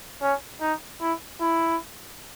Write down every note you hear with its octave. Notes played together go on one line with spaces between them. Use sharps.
C#4
D#4
E4
E4